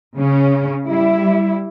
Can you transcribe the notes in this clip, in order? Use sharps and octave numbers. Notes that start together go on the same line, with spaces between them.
C#3 C#4
G3 E4